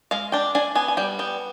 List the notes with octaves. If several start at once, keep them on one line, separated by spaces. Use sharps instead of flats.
G#3 F5
D4 G5
D4 G#5
B3 G#5
G#5
G3 G5
B3 G5